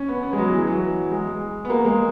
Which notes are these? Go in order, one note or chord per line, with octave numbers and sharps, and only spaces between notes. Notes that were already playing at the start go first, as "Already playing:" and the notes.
Already playing: C#4
B3
B3
G#3
F#3
E3
F#3
G#3
B3
A#3
G#3